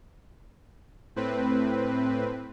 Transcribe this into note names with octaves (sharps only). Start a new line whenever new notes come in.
A2 C4 B4